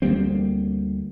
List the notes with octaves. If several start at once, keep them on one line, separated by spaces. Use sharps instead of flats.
D2 G3 A#3 C4